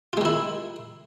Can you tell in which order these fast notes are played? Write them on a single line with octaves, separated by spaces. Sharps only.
F4 G#3 D#3 E4